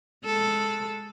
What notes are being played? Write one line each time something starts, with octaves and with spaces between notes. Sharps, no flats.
G#3 A4